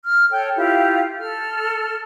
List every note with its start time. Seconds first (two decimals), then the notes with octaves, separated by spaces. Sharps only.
0.04 F6
0.30 A4 C#5 G5
0.55 E4 F4 G4
1.19 A4 F6